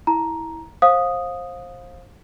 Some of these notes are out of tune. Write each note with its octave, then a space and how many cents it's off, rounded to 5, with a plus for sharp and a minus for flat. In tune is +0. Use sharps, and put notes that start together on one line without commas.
E4 -15 A#5 +5
C5 +25 F5 +20 D#6 +0